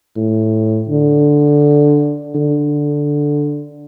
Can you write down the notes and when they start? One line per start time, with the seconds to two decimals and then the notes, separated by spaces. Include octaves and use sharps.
0.16 A2
0.89 D3
2.35 D3